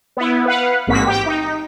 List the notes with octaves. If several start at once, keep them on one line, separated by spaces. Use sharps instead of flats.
B3 E4
B4 F5 F#5
A1 G#2 A#3 C4 F#4 B6
G4 G5
D#4